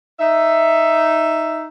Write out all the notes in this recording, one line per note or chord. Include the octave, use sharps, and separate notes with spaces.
D#4 E5